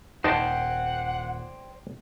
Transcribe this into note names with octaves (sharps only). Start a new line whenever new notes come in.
D#1 D#4 C5 D5 F#5 G5 A5